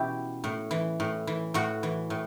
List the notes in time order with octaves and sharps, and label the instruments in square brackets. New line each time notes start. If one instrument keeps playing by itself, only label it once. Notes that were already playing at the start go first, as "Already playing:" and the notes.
Already playing: [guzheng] B2 E3 C#4 E4 G4
A2
E3
A2
E3
A2 F#4
E3
A2